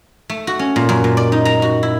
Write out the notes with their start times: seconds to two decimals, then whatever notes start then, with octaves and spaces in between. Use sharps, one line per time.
0.30 A3
0.47 F#4
0.59 C#4
0.76 A#2
0.89 F#2
1.04 A#2
1.17 D5
1.32 D#4
1.45 A#5
1.62 F#4
1.83 E4